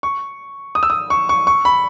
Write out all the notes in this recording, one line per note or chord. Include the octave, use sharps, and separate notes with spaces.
C#6
D#6
E6
D#6
C#6
C#6
C#6
B5